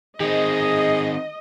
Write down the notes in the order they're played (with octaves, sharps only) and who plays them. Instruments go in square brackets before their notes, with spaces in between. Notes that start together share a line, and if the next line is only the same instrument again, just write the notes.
[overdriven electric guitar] D#3 C4 [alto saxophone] G#4 [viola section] D#5